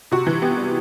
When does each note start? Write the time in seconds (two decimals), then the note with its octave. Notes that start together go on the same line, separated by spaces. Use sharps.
0.11 C3 F#4
0.27 E3
0.42 B3 G4
0.57 G3